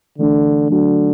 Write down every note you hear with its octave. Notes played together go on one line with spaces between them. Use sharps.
D3 E3 A3 D4
D3 F#3 A3 D4 F#4